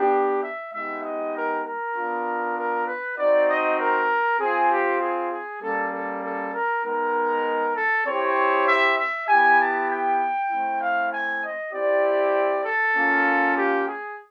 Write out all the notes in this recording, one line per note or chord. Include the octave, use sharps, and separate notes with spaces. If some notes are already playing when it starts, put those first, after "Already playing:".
Already playing: B3 D4 G4
E5
G#3 B3 D#4 G4 E5
D#5
A#4
A#4
B3 D4 F4
A#4
B4
C4 D#4 F#4 D5
D#5
A#4
C4 F4 G#4
G4
G#4
G#4
G3 A#3 C#4 A4
A4
A4
A#4
G#3 B3 D#4 A#4
A4
C4 E4 G4 C#5
E5
E5
B3 E4 G4 G#5
A5
G5
A3 C4 E4
F5
G#5
D#5
C4 E4 G4 D5
A4
A#3 C#4 F4
G4
G#4